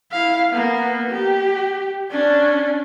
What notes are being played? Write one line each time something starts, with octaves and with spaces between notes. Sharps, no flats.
E4 F5
A#3 B3
G4
C#4 D4